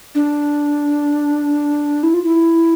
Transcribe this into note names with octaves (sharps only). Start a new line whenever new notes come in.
D4
E4
F4
E4